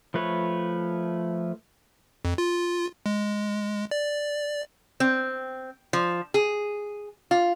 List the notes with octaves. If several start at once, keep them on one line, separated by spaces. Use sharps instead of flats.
F3 A3 B4 C#5
F2
F4
G#3
D5
C4
F3
G#4
F4